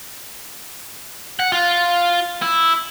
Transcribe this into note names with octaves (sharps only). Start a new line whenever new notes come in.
F#5
F4
E4